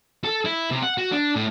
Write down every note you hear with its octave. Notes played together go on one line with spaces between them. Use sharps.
A4
E4
C3
F#5
F#4
D4
A2